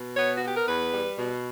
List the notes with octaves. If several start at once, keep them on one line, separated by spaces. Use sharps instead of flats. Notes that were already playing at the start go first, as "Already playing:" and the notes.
Already playing: B2
B3 C#5
B3 F#4
G4
A#4
E2 B4
G3
B2